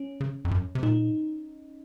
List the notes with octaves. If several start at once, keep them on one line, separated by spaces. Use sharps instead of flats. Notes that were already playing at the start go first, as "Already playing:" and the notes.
Already playing: C#4
C#3
F2
F#2
C3
A#2 D#4